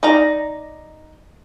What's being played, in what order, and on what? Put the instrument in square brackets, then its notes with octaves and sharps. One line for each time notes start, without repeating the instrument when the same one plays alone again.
[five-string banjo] D#4 D5 A#5